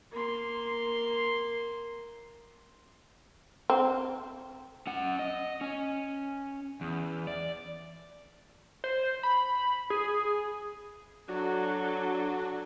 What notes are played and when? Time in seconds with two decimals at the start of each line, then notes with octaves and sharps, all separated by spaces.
0.12 A#3 C6
3.70 C4
4.87 C#4 F#5
5.19 D#5
5.61 C#4
6.81 E2
7.27 D5
8.84 C5
9.23 B5
9.90 G#4
11.28 F#3 D4 F#4 A4